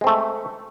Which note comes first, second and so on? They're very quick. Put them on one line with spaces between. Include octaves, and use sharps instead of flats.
G#3 C4 A3